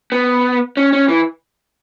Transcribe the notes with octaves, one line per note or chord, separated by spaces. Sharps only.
B3
C#4
C#4
E3